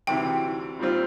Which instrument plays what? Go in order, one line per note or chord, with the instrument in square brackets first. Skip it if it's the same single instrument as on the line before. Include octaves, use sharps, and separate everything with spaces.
[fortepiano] D2 C3 E3 [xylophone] G5
[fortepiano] A#2 G3 C4 F4